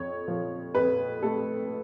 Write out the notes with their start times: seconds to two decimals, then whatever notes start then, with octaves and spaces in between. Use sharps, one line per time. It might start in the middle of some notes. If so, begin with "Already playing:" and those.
Already playing: F2 C#5
0.28 F3
0.75 F2 B4
1.23 A3 A4